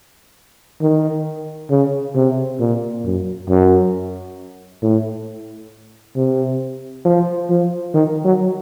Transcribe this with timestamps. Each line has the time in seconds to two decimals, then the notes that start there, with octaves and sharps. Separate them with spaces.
0.81 D#3
1.70 C#3
2.15 C3
2.60 A#2
3.05 F#2
3.49 F#2
4.83 A2
6.16 C3
7.05 F3
7.50 F3
7.94 D#3
8.25 F#3